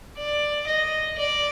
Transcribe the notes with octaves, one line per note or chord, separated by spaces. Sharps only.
D5
D#5
D5